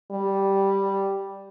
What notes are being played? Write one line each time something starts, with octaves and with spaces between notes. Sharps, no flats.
G3